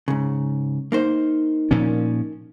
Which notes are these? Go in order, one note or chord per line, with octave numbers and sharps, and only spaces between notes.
G#2 C#3
A#3 D#4 C5
A#2 F3 C#4